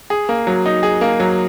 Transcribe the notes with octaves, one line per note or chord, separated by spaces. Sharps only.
G#4
A#3
F#3
D#4
G#4
A#3
F#3